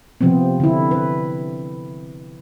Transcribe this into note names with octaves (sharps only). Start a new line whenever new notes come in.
C3 F3 B3 C4
D3 E4
B4